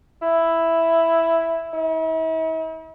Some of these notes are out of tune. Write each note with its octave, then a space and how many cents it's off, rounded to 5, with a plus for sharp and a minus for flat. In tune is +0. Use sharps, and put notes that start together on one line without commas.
E4 +0
E4 -45